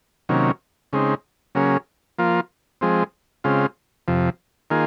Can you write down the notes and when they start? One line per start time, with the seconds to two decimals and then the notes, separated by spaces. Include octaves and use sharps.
0.29 C3 D#3 F#3 A#3 C#4
0.93 C#3 G#3 C4 D#4
1.55 C#3 F#3 A#3 C#4 G#4
2.18 F3 A#3 F4
2.81 F3 G#3 C4
3.44 C#3 G#3 C4 F4
4.08 F2 C3 F3
4.71 D#3 A#3 F4 G#4